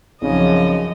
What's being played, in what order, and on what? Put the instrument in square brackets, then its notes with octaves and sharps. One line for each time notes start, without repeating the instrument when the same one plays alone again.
[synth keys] A#1 C4 D#4 [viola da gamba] F#2 F3 D#5 [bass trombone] C#3